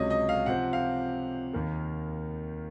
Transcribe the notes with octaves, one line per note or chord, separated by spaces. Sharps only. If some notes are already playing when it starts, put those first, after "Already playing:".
Already playing: C#2 C3 F#3 C#4 C#5 D#5
D#5
F5
C3 F3 C4 F#5
F5
D#2 D#3 A#3